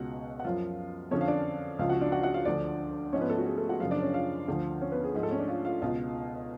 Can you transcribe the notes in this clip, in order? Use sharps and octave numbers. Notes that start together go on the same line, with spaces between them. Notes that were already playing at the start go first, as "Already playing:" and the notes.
Already playing: C#2 B2 F#4 F#5
F#5
F#2 F3 F4 F5
F2 D3 F3 C#4 C#5
F5
D4 D5
C#2 C#3 F3 F4 F5
F#4 F#5
D4 D5
F#4 F#5
F#4 F#5
F4 F5
D2 D3 F3 D4 D5
G#2 F3 C#4 C#5
B3 B4
A3 A4
F#4
G#4
A3 A4
F#4 F#5
F#2 C#3 F3 F4 F5
D4 D5
C#4 C#5
F4 F5
D2 D3 F3
C#4 C#5
B3 B4
G#4
G#2 F3 G#4
A3 A4
C#4 C#5
D4 D5
F4 F5
F4 F5
C#2 B2 F4 F5